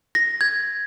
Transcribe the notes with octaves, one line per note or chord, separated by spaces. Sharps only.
A#6
G#6